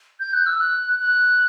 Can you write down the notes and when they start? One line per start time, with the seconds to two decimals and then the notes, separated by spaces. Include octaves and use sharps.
0.20 G6
0.33 F#6
0.46 E6
0.60 F#6
1.00 F#6